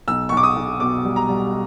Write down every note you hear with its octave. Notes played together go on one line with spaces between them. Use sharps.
B1 E6
C#6
B1
D6
D#6
B1
B2 D6
G3
A#5
G3